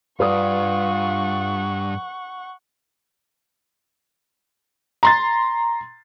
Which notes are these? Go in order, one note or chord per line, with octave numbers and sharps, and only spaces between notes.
G2 F4 B4 D5 F#5 C#6 D#6
A#5 C6 A6